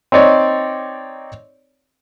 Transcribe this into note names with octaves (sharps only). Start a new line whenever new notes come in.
C4 D#4 C#5 D5